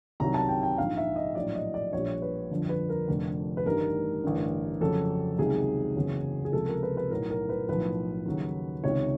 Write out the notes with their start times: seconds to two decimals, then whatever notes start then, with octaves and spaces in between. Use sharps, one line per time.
0.20 C2 C3 D#3 F#3 A#5
0.34 A5
0.49 G5
0.63 G5
0.77 A#1 G#2 F3 F5
0.97 E5
1.16 D#5
1.35 A#1 A2 F#3 D5
1.55 D#5
1.74 D5
1.93 A#1 A#2 G3 C#5
2.22 B4
2.51 G1 F2 D3 F3
2.69 B4
2.89 A#4
3.08 F1 F2 D3
3.57 B4
3.66 A1 G2 D#3 G3 A#4
4.23 A1 G2 D3
4.80 F2 C#3 F#3 A4
5.38 C#2 C3 D#3 F#3 G#4
5.96 F#1 E2 C#3 F#3
6.45 G#4
6.53 C#2 C3 F3 A4
6.68 A#4
6.83 B4
6.97 B4
7.10 B1 A2 F#3 A#4
7.30 A#4
7.49 B4
7.69 B1 A2 F3 B4
8.25 D#2 C#3 F#3
8.83 C#2 C3 D#3 C#5